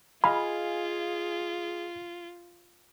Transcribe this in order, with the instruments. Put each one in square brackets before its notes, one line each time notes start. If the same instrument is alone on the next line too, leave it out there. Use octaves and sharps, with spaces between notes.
[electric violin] F4 [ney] G#4 [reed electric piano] D#5 F5 G#5 [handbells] B5